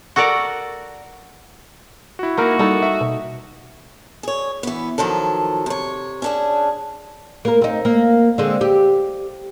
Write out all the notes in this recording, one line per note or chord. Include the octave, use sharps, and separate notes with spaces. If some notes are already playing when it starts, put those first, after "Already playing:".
F#4 A4 A#4 D5 F#5
E4 F#4
A#3 D#4 E4 F#4 A#4
G3 D#4 A4
E5
B2
G#4 C#5
E3 B3
D#3 F3 F#3 A4
C3 C#5
C#4 D4 G#4
A#3 A#4
C4 D#4
A#3
D3 G#3 C4
G4